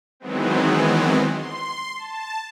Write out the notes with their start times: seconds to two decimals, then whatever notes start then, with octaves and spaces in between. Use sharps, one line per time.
0.20 D#3 E3 F#3 G#3 B3 C4
1.32 C6
1.96 A5